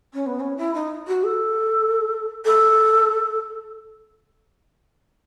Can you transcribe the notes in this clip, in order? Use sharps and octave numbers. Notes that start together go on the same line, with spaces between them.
C#4
B3
C#4
E4
D#4
F#4
A4
A4